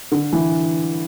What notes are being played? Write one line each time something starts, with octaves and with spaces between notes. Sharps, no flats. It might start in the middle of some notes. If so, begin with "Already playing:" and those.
D3
E3